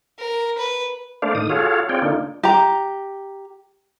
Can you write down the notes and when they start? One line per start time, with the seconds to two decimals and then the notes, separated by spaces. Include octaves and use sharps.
0.19 A#4
0.57 B4
1.22 A3 A#3 D4 C5 D5 F5
1.35 A2 D#3 D#6
1.49 F4 F#4 G#4 A4 C#5 F5
1.89 C4 F4 G#4 C#5 D5 G5
2.02 D3 A#3 D4 D#4 F4
2.43 G4 A#5